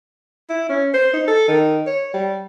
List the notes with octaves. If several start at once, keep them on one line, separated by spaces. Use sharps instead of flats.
E4
C#4
C5
D#4
A4
D#3
C#5
G3